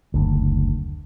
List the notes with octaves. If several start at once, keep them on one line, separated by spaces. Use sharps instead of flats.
F#1 D2